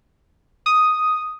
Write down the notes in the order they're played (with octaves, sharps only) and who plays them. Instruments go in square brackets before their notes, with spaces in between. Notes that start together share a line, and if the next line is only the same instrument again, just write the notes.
[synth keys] D#6